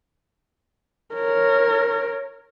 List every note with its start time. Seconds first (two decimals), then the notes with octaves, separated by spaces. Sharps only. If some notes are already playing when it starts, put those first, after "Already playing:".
1.15 A#4 C#5